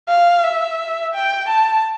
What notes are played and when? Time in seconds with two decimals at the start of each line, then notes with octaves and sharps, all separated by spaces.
0.09 F5
0.44 E5
1.14 G5
1.49 A5